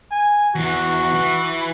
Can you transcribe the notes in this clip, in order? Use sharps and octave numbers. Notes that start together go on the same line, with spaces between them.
G#5
E2 E3 F#4
E3